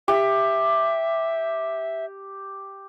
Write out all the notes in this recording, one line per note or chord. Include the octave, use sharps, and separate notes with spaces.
G4 E5